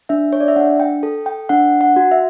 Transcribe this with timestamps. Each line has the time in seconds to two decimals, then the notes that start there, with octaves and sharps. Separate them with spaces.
0.09 D4 E5
0.33 C#5
0.41 D5
0.48 E5
0.56 D4 F#5
0.80 G5
1.03 A4
1.26 G5
1.49 D4 F#5
1.81 F#5
1.96 F#4
2.12 E5